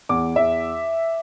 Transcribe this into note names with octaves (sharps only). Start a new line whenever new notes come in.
E2 D6
E2 E5